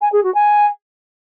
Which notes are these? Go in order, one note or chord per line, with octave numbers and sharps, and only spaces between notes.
G#5
G#4
F#4
G#5